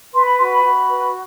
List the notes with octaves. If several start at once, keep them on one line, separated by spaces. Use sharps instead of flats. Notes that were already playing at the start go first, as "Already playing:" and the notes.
B4 C6
B5
F#4 C6
B5
F#4
B4